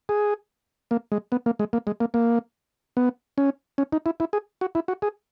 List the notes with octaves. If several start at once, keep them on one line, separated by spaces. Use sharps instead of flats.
G#4
A#3
G#3
B3
A#3
G#3
A#3
G#3
A#3
A#3
B3
C#4
C#4
D#4
E4
E4
G#4
F#4
E4
F#4
G#4